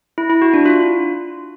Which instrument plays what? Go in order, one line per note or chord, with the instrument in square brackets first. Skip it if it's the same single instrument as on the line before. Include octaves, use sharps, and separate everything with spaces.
[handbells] E4
E4
F#4
D4
F4